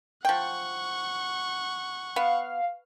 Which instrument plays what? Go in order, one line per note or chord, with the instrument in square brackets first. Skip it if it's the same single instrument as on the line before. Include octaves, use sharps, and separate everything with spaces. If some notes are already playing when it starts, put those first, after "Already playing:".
[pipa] F3 G5 [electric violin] F#5 C#6
[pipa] B3 [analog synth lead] F5